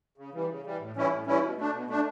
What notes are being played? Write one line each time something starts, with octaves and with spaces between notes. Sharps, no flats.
C#3
E3 G3
C#3
E3 G3
A2
E3 G3 C#4 E4
A2
E3 G3 C#4 E4
B2
A3 D4
B2
A3 D4